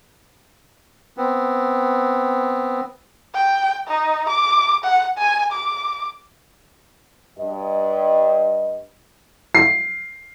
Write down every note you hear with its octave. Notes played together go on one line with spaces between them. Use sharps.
B3 C4
G5
D#4
D6
F#5
G#5
D6
G2 D#5
C7